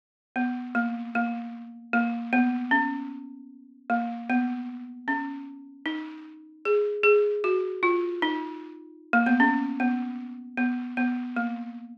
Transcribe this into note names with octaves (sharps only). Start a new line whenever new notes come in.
B3
A#3
A#3
A#3
B3
C#4
A#3
B3
C#4
D#4
G#4
G#4
F#4
F4
D#4
A#3
B3
C#4
B3
B3
B3
A#3